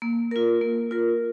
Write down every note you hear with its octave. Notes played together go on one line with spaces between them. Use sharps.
A#3
F4 A#4
A#3
F4 A#4